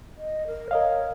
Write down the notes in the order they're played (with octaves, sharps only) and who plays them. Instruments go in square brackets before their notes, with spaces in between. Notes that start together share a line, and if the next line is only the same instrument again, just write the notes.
[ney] D#5
A#4
[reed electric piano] A#4 D#5 F5 [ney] C#5